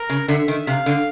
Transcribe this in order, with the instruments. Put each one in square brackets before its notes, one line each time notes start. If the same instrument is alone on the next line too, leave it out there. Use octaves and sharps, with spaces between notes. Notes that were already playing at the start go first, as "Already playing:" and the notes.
Already playing: [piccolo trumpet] A#4
[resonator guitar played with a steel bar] C#3
[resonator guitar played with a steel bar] D3 [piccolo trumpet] E5
[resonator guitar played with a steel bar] D#3
[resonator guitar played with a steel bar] C3 [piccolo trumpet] F5
[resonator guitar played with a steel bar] D3